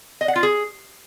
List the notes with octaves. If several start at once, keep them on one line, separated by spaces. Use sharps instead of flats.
D#5
F#5
F4
G#4